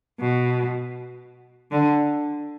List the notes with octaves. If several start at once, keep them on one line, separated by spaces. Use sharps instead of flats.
B2
D3